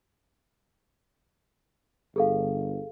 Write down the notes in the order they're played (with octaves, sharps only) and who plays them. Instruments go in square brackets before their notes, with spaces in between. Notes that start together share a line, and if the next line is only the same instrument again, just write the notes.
[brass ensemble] G1 [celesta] G#4 A4 F5